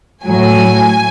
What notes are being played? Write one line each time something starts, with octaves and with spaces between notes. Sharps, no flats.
A2 F#3 G#5